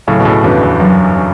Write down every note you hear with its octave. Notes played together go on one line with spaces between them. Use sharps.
A2 C#3 F#3
B2
A2 C#3
E2 G2 C#4 F#4 B4 D5
E2
F#2 F#3
C#4 F#4 B4